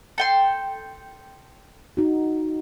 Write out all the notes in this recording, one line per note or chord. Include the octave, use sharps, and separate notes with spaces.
A4 G5 C6
D#4 F#4